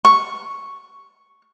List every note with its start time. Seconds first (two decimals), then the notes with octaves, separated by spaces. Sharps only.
0.05 C#6